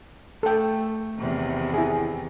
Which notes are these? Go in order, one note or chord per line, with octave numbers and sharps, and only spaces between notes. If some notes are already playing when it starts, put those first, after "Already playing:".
A3 A4 G5
E2 C3 D#3
E4 G#4